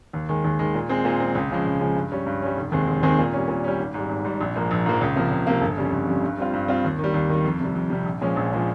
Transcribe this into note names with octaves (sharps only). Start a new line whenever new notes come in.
D#2
D#3 G#3
D#2
D#3 G#3
A#2
G#3 C4
A#2
G#3 C4
C#2
C#3 F3 G#3
C#2
C#3 F3 G#3
G2
G3 C#4
G2
G3 C#4
F1
D#2 D#3 G#3 C4
F1
D#2 D#3 G#3 C4
A#2
G3 C#4
A#2
G3 C#4
G#1
G#2 G3
G#1
G#2 G3
A#1
G#2 F3 A#3
A#1
G#2 F3 A#3
C#2
C3 F3 A#3
C#2
C3 F3 A#3
G1
F2 C#3 G3
G1
F2 C#3 G3
G2
G3 C4 F4
G2
G3 C4 F4
D#2
D#3
G3
D#2
D#3 G3
F2
C3 G3
F2
C3 G3
A#1
A#2 F3 G#3 C#4
A#1
A#2 F3 G#3 C#4